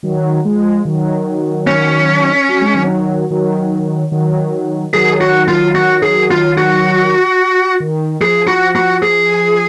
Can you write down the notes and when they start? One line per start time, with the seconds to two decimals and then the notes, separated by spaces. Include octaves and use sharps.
0.03 D#3 F#3
0.45 F3 G#3
0.85 D#3 F#3
1.67 C#4
2.49 F#3
2.61 G#3
2.74 D#3 F#3
3.31 D#3 F#3
4.12 D#3 F#3
4.94 D#3 F#3 G#4
5.21 F#4
5.48 F4
5.75 F#4
6.03 G#4
6.31 F4
6.58 F#4
7.80 D#3
8.20 F3 G#4
8.47 F#4
8.76 F#4
9.03 G#4